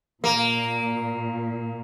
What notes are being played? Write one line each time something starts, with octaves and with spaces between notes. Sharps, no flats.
A#2 A#3